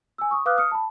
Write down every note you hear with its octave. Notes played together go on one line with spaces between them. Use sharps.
G#5 E6
C#6 D#6
B4 F5 D6 D#6 F6 F#6
D#6 F6 C#7
A5 B5